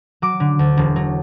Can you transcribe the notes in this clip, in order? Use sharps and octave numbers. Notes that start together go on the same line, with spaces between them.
F#3 D6
D3
D2
E1
F#3